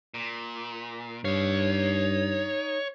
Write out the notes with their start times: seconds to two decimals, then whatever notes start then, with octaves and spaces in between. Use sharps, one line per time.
0.14 A#2
1.25 G2 D#4 C#5 F5